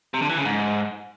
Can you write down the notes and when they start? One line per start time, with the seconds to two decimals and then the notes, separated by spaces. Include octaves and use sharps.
0.14 C3
0.22 D3
0.30 E3
0.38 C#3
0.45 G#2